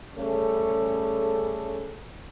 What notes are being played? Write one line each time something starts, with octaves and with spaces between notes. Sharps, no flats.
C#3 G3 A3 C#4 G#4 A4